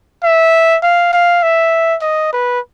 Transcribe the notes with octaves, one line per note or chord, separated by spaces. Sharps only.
E5
F5
F5
E5
D#5
B4